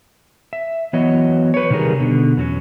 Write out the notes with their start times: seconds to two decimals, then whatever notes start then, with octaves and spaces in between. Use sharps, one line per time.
0.53 E5
0.93 E3 F#3 B3 C#5 D#5
1.54 B4 C#5
1.70 C3 D#3 G3 G#4 A#4
2.00 B2 D3
2.37 E2 F#3 C#4